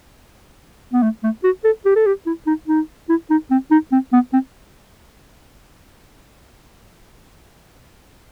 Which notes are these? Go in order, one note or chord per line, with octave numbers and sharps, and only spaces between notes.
B3
A3
A3
F#4
A4
G4
A4
G4
E4
D#4
D#4
E4
D#4
C4
D#4
C4
B3
C4